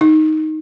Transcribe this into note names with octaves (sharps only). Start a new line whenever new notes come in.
D#4